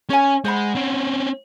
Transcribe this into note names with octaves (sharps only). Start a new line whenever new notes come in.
C#4 C#5 G#5
G#3 C5 F#5 B5
C4 C#4